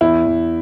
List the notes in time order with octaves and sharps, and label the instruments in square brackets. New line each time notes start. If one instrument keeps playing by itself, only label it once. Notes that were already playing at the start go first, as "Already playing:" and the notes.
[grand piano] E2 E4
E2